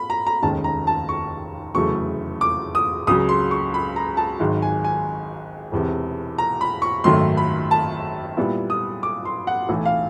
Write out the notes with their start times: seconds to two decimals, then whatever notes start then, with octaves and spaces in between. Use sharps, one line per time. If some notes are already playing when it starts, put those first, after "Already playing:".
Already playing: B5
0.10 A#5
0.27 A#5
0.42 F1 D#2 D#3 G#3 C#4 A5
0.64 A#5
0.87 A5
1.09 C#6
1.75 F1 E2 C#3 F#3 A3 C#6
2.41 D6
2.75 D#6
3.07 C#2 C#3 F#3 D#6
3.29 C6
3.51 C#6
3.74 B5
3.96 A#5
4.17 A5
4.40 G#1 G#2 D#3 F#3
4.62 G#5
4.84 G#5
5.72 E1 E2 C3
6.38 A#5
6.61 B5
6.82 C#6
7.04 G#1 F#2 D#3 F#3 A3 C6
7.37 B5
7.71 A5
8.37 A#2 G3 B3 E4
8.70 D#6
9.03 D6
9.25 C6
9.47 F#5
9.69 B1 A2 E3 A3
9.85 F5